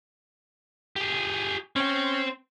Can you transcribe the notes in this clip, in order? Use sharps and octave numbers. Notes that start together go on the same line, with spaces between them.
G4 G#4
C4 C#4 G5